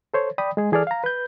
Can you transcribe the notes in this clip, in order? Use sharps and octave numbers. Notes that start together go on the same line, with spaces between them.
A4 C5 C#5
D5 G5 B5 D#6
G#3 G#4
E3 G#4 A4 D5 F6
F5 A#5
B4 G6